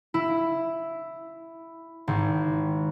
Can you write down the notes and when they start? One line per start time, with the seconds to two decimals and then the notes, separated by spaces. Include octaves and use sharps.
0.14 E4
2.08 G#1